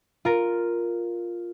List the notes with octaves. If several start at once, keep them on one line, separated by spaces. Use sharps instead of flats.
F4 A#4